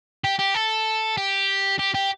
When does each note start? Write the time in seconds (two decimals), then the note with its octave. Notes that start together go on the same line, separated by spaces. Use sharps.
0.24 G4
0.39 G4
0.54 A4
1.17 G4
1.79 G4
1.95 G4